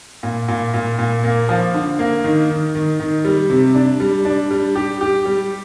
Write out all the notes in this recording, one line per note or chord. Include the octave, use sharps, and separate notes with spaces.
A#2
A#2
A#2
A#2
A#3
F3
D3
A#3
D#3
D#3
D#3
D#3
G3
C3
D4
G3
D4
G3
G4
G4
G3